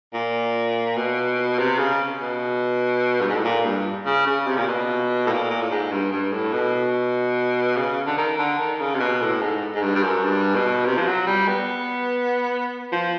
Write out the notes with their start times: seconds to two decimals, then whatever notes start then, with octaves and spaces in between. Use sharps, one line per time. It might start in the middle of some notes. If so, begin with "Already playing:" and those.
0.14 A#2
0.97 B2
1.59 C3
1.79 C#3
2.21 B2
3.21 G2
3.29 G#2
3.36 A2
3.44 A#2
3.65 G2
4.06 C#3
4.27 C#3
4.47 C3
4.57 A#2
4.68 B2
5.26 A2
5.29 A#2
5.50 A#2
5.62 A2
5.70 G#2
5.91 G2
6.12 G2
6.32 A2
6.53 B2
7.76 C#3
8.06 D3
8.17 D#3
8.39 D3
8.59 D#3
8.80 C#3
8.95 C3
9.00 B2
9.22 A2
9.42 G#2
9.75 G#2
9.82 G2
9.95 G2
10.03 F#2
10.24 G2
10.56 B2
10.86 C3
10.98 F3
11.07 F#3
11.27 G3
11.48 B3
12.92 F3